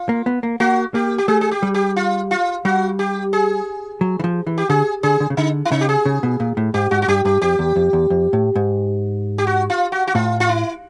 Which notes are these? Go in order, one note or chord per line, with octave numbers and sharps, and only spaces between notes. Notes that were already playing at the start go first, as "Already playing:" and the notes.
Already playing: F4
A#3
B3
A#3
A#3 F#4
A#3 G4
G4
A3 G#4
G#4
G4
G3
G4
F4
F4
G3 F#4
G4
G#4
F#3
E3
F3
E3
G4
D3 G#4
D3 G#4
D3
C#3
D3 D#4
E4
C#3 D#4
G4
G#4
C#3
B2
A#2
A2
G#2 G4
G#2 F#4
F#4
G2 G4
G2 G4
F2 G4
E2
F2
E2
F2
A2
G#2
G4
F#4
F4
F#4
F#4
A2 F4
F4
E4